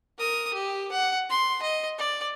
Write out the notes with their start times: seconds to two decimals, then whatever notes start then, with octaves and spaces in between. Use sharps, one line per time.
0.18 A#4 D#6
0.53 G4
0.91 F#5
1.29 C6
1.62 D#5
1.98 D5